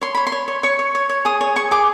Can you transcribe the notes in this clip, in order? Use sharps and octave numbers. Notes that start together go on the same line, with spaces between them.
C#5 C6
C#5 B5
C6
C#5
C#5
C#5 C#6
C#5
C#5
C#5
G#4 D#6
C#5
G#4 C#6
G#4 D6